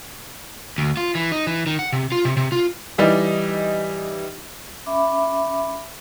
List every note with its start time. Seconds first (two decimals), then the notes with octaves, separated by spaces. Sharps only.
0.78 D2
0.97 F4
1.15 E3
1.32 D#4
1.47 E3
1.67 D#3
1.79 F#5
1.92 C3
2.12 F4
2.25 C3
2.37 C3
2.52 F4
2.98 E3 G3 D#4
4.86 C#4 E5 B5 D6